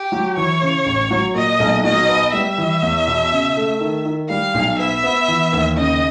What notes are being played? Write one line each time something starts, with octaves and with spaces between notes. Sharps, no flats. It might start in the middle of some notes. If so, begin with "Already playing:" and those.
Already playing: G4
F#3
E3 C#5
C#3
A1
F#3
A#2 D#5
B1
F#3 D#5
B3
G3 E5
E3
E2
B2
C#3
A3
D#3
D#3
G3 F5
B1
B3 E5
B3
E3
D#2
C#3 D#5